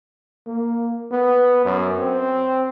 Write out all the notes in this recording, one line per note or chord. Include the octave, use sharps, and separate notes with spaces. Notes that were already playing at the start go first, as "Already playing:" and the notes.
A#3
B3
F#2
C4